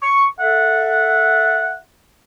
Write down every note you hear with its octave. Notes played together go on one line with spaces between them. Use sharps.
C#6
A4 E5 F#5